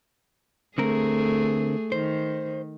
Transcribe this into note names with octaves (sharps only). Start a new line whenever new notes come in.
D3 A3 C4 G#4 A#4
D#3 C5